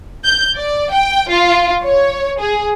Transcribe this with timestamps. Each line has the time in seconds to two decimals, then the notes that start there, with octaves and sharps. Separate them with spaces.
0.24 G6
0.56 D5
0.91 G5
1.29 F4
1.84 C#5
2.40 G#4